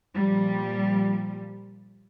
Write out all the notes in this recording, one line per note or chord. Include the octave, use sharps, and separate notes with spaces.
A#2 F3 G3